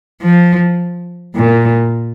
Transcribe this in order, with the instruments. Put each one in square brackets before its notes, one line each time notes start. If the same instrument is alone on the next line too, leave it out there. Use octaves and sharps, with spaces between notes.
[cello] F3
A#2